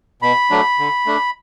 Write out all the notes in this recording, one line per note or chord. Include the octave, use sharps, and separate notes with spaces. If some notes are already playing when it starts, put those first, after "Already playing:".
B2 B5
F#3 A3 D4
D3
A3 D4